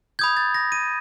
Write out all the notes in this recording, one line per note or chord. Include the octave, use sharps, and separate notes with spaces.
B5 D#6 G6 G#6
A6
A#6
D#7